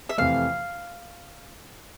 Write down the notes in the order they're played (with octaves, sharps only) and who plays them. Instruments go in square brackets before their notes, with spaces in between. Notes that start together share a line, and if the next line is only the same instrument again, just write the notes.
[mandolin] E5
[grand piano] F2 C3 E3 A3 [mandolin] F5